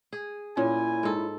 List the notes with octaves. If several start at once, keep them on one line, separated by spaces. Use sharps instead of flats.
G#4
A#2 C#4 E4 G#5
G#2 A4